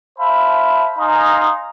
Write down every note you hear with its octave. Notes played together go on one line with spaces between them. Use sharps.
C5 E5 F5 A5 B5
D#4 F5 G#5 A#5 C6 D#6